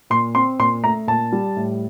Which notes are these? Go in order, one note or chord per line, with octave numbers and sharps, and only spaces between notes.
A#2 C6
C4 C6
A#2 C6
A3 A#5
A#2 A5
G3
A2